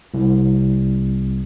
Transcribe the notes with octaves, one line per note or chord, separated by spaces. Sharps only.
C2